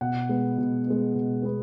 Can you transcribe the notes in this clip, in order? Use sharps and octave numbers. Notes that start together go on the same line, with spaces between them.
B2 F#5
G#3 B3
B2
G#3 B3
B2
G#3 B3